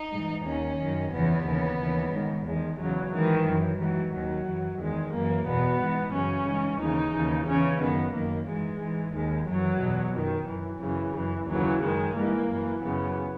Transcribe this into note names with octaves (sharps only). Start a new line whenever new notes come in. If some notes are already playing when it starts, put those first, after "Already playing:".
Already playing: D#4
G#2 E3
D#2 D#3 C#4
F#2 D#3
E2 C#3 E3 B3
D#2 C#3 E3
D#2 C#3 E3
G#2 D#3
E2 D#3 G#3
E2 C#3 E3 F#3
G#2 D#3 E3
F#2 E3
G#2 E3 F#3
D#2 D#3 F#3
F#2 E3
E2 D#3 G#3
F#2 E3 A#3
E2 B2 B3
G#2 E3
F#2 C#3 E3 C#4
G#2 E3
D#2 C#3 E3 D#4
D#2 C#3 E3
E2 C#3 E3 C#4
F#2 D#3 B3
F#2 D#3 A#3
G#2 E3 G#3
G#2 E3
D#2 D#3 G#3
F#2 E3 F#3
E2 B2
F#2 D#3
F#2 E3
F#2 C#3 E3
F#2 E3
D#2 C#3 E3 F#3
F#2 D#3 G#3
G#2 E3 A#3
F#2
E3
F#2 C#3 E3 B3